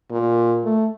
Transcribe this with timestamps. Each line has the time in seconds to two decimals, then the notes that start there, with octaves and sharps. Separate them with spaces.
0.11 A#2
0.64 A3